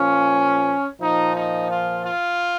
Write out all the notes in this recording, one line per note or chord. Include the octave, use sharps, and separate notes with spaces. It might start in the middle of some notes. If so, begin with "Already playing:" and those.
Already playing: A#2 F3 C#4
A#2 F3 D#4
D#4
F4
F4